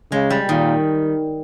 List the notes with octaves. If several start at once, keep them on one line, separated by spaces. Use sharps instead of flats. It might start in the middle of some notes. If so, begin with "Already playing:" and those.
C#3 G#3
G3
A#2 D#3